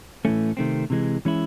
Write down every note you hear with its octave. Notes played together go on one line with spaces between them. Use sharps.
A2 E3 A3 C#4
C3 D#3 F#3 A3 C4
C3 E3 G#3
E3 G#3 C#4 E4